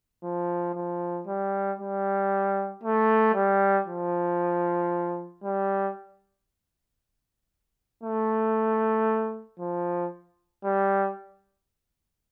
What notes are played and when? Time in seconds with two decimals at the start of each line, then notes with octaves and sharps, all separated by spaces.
0.23 F3
0.75 F3
1.27 G3
1.79 G3
2.83 A3
3.35 G3
3.87 F3
5.44 G3
8.03 A3
9.59 F3
10.64 G3